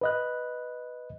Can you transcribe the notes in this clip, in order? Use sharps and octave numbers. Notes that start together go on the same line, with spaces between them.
B4 D#5 F#6